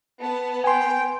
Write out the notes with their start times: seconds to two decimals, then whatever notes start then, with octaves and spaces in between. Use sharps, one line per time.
0.22 B3 A5
0.64 G5 G#5 C6